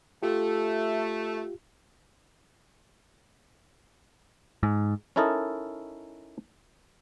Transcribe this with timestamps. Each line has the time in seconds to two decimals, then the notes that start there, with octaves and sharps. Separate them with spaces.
0.23 A3 F4 G4
4.63 G#2
5.16 C#4 D#4 E4 A4 A#4 D#5